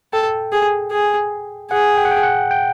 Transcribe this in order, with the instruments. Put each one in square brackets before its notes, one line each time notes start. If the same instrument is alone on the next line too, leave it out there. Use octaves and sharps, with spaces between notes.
[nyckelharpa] A4 [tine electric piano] G5
[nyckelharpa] G#4
G#4
[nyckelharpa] G#4 [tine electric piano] F#5
[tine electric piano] G5
F#5
G5
F#5
G5